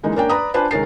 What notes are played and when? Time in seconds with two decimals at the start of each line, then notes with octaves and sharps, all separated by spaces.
0.03 D3 E3 G#3 A#3 D#4
0.16 A#3 C#4 D4 A#4 G5
0.29 B4 D5 A#5 B5 D#6
0.54 D4 F4 B4 C5 G#5 A5
0.71 C#2 D#3 C#4 A#4 A6 C7